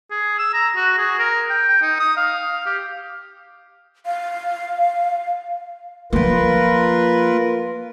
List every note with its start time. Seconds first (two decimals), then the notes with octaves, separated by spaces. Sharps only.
0.11 G#4
0.39 E6
0.54 A#5
0.77 F#4
0.98 G#4
1.19 A#4
1.50 G5
1.68 G5
1.82 D#4
2.00 D#6
2.17 F5
2.66 G4
4.06 F5
6.13 F3 A#3 F4 A#4 B4